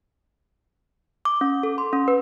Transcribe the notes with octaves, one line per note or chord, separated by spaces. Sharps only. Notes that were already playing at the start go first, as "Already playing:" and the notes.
D6
C#4
A4
C6
C#4
B4